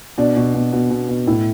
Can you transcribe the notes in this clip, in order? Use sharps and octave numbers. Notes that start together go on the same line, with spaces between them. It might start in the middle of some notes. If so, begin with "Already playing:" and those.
B2 D4
B2
B2
B2
B2
B2
A2 E4